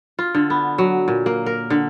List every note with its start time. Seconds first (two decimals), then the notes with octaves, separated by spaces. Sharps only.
0.19 F4
0.34 D3
0.50 B3
0.78 F#3
1.08 A#2
1.26 A#3
1.46 A#4
1.70 D3